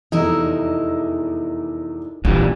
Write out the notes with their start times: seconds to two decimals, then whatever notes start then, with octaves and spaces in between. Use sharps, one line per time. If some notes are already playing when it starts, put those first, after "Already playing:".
0.12 F1 E2 D#4 E4 A#4 D#5
2.25 A#2 E3 G3 D4